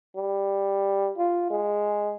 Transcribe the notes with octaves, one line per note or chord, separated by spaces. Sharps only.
G3
F4
G#3